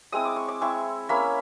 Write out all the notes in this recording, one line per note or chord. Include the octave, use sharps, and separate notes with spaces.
G#3 C4 E4 D#6
D6
C#6
D6
G#3 C4 E4 C#6
A#3 C#4 E4 B5